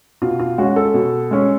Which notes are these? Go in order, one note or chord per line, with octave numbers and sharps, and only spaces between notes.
B2 F4
F4
G#3 C#4 F#4
A4
B2
G#3 C#4